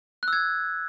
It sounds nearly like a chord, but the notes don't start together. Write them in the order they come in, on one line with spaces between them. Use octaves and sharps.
F#6 E6 G#6